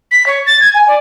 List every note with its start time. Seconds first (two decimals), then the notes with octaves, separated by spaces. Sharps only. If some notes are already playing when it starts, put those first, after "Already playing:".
0.11 B6
0.26 C#5
0.46 A6
0.61 G#6
0.74 G#5
0.87 D5